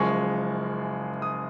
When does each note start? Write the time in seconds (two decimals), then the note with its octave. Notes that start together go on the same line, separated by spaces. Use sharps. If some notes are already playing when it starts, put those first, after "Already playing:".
Already playing: F#1 F#2 F3 G#3 C#6
1.22 D#6